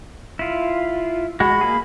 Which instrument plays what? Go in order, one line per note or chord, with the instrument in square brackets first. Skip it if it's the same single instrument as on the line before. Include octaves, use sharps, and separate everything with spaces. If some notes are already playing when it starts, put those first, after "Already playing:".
[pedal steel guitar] E4 F4
[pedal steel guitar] G#3 F#4 [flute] B5
[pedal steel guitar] A#3 G#4